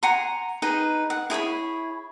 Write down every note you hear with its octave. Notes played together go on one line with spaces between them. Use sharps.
F#5 G#5 A#5 C6
D#4 G#4 B4
F#5
E4 G#4 C#5 B5